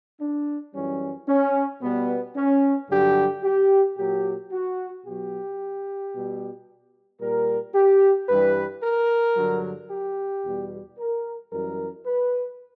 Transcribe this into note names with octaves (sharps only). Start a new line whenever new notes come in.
D4
F#2 E3 G3 C#4
C#4
B2 G3 B3
C#4
G2 D3 F#3 G4
G4
A#2 F#3 G4
F#4
B2 F#3 G4
B2 G3
A#2 G3 A#4
G4
G2 E3 G3 B4
A#4
G2 D3 F#3
G4
E2 B2 G3
A#4
F#2 E3 G3 A#4
B4